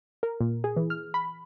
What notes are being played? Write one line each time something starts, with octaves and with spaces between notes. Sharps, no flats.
A#4
A#2
G#4
E3
F6
B5